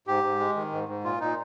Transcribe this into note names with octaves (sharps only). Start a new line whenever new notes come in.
G#2 G4
G#2
G#3
D#3
G#2
G#2
A#2 F4
A#2 D#4